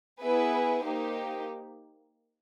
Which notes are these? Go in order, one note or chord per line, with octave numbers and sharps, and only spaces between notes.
B3 E4 G#4 B4
A#3 D#4 G4 C5